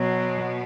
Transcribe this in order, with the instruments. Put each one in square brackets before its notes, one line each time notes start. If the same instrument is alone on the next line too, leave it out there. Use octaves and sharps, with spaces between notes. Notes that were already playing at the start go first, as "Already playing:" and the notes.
Already playing: [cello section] B2 [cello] F#3